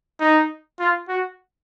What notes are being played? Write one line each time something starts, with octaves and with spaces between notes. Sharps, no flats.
D#4
F4
F#4